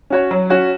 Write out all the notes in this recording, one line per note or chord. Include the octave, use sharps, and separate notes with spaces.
C#4 F#4 C#5
F#3
C#4 F#4 C#5